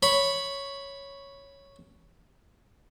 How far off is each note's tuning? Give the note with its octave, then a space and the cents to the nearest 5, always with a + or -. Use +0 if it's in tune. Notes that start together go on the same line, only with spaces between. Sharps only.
C#5 +0 B5 +0